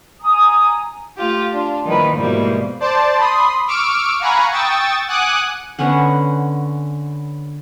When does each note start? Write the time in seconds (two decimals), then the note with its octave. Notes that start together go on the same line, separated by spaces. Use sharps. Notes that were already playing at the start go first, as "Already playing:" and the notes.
0.22 G#5 A#5 D#6
1.17 A3 F4 G4
1.53 D4 F4
1.86 D#3 F3 A#3 E4 A#4 B4
2.17 G#2 B2 E3 F3 G3 A#3
2.80 C5 D5 A5
3.18 B5 C6 D#6
3.67 C#6 D6 E6 F6 D7
4.20 F5 F#5 G#5 A#5 B5 C#6
4.52 G5 C#6 D#6 E6 A6
5.08 F#5 G#5 D6 D#6 F#6
5.79 D3 B3 C#4 F#5